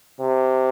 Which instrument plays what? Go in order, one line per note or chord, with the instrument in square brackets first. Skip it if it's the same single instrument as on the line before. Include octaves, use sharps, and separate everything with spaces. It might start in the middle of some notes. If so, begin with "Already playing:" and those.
[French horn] C3